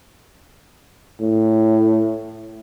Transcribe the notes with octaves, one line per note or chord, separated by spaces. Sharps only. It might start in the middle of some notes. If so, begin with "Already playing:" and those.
A2